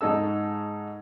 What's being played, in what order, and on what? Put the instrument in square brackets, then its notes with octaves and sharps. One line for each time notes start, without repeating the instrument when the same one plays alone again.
[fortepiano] G#2 D#4 A4 E6